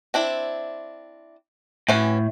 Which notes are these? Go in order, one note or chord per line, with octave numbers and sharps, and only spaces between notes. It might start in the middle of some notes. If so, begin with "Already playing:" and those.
C4 D4 E4
A2 E3 C#4 F#4